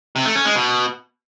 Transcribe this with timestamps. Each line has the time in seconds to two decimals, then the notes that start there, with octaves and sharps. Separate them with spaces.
0.16 C3
0.26 A3
0.35 C#4
0.45 G#3
0.55 B2